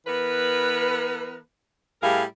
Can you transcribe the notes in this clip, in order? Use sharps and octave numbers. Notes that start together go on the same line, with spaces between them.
E3 B3 A#4 B4
A2 G3 E4 G#4 A#4 F5